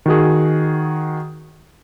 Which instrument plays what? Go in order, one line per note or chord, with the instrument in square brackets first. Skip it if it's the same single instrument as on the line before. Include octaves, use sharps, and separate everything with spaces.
[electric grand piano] D#3 F#4 G#4